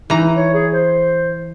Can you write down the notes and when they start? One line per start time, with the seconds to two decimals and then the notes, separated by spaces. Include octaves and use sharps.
0.10 E3 D#4 A#5
0.36 C#5
0.54 G#4
0.73 C5